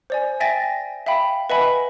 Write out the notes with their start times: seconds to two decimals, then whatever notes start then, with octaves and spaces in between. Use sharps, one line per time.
0.10 C5 D5 G#5
0.40 E5 G5 G#5 A6 A#6
1.06 E5 F5 G5 B5
1.50 B4 D#5 E5 F#5 G#5 B5